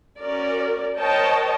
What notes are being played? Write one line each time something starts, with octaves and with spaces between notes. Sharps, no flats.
C#4 F#4 A#4 D5
A#4 C5 C#5 D#5 G5 A5